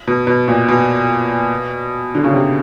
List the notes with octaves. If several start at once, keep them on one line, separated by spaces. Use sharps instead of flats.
B2
B2
A#2
B2
D3
C#3
C3